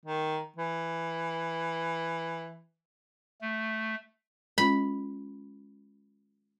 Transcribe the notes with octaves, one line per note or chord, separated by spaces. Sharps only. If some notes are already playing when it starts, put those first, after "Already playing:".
D#3
E3
A3
G#3 C#4 F4 B5